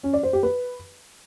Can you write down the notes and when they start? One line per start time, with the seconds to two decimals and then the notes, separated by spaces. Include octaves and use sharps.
0.03 C#4
0.13 D5
0.23 C5
0.33 G4
0.43 B4